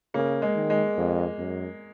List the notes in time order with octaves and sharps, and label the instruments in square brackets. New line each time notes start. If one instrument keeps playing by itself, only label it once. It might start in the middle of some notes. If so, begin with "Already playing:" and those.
[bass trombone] C#3 [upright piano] A#3
[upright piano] G#3
[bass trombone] D#3
[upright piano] G#3
[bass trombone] F2
F#2